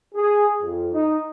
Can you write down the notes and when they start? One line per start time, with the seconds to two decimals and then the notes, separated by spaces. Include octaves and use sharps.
0.14 G#4
0.61 F2
0.92 D#4